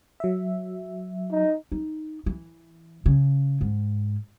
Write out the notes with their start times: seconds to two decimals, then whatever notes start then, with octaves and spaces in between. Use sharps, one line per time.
0.20 F#3 E5
1.31 D#4
1.72 D#4
2.26 E3
3.06 C#3
3.61 G#2